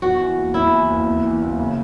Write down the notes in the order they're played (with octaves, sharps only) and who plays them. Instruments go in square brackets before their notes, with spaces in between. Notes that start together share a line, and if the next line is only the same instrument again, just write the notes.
[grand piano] E2 [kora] F#4
[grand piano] E3
F#1
[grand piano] E2 [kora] E4
[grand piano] E3
F#1
E2
E3
F#1
C#3